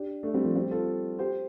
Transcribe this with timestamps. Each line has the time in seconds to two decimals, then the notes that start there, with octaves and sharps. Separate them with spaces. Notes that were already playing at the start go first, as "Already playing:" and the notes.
Already playing: D4 G4
0.23 A3 D4
0.34 G3 C4
0.45 F3 A3
0.55 G3 C4
0.71 F4 A4
1.19 G4 C5